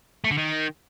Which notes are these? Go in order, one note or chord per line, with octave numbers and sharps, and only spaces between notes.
A3
D3
D#3